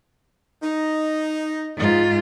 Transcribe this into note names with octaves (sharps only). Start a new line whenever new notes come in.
D#4
G#2 F4